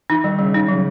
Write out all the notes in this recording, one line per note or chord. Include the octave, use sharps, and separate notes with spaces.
E3 D#4
D#3 G3
C#3 G3
C#3 D#4
C#3 F#3